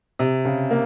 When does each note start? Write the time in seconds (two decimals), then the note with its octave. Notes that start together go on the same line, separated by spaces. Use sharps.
0.19 C3
0.45 C#3
0.71 A#3